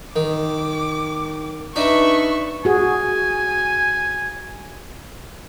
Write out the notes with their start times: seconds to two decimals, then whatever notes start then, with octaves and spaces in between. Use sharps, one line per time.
0.16 D#3 D6
1.76 D4 D#4 B4 E5 C#6
2.65 F#4 G#4 G#5